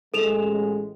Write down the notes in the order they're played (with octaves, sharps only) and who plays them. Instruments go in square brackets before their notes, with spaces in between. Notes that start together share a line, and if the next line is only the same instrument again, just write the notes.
[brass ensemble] A1 G#3 [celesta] A4 E7 F7